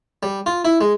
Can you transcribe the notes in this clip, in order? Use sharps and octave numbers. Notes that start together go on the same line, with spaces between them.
G3
F4
E4
G#3